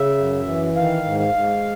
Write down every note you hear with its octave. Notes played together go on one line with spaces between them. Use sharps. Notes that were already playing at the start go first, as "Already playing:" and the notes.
Already playing: C#3 E5
F#2
E3
D#3 F5
G#2
F5
G#2